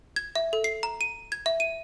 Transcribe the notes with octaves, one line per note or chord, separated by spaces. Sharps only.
G#6
E5
A4
C7
A#5
D#7
G#6
E5
D#7